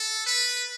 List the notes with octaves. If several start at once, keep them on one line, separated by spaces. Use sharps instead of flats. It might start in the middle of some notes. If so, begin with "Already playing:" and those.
Already playing: A4
B4